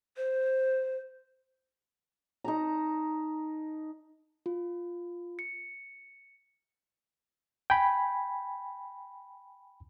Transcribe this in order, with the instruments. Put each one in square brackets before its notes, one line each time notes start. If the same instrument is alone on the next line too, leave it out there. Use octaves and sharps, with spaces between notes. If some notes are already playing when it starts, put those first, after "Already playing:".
[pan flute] C5
[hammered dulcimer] D#4 A5 A#5
[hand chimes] F4
C#7
[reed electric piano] G5 G#5 B5